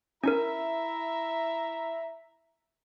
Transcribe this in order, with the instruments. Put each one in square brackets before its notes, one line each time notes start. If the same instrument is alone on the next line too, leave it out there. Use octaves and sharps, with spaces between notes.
[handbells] C#4 D#4 A#4 [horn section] E4 E5 A#5